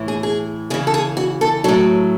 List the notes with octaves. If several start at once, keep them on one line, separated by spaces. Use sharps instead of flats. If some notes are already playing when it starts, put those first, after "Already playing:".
Already playing: A2 E3
G#4
G#4
C#3 E3 G#4
A4
G#4
F#4
A4
A2 F#3 A4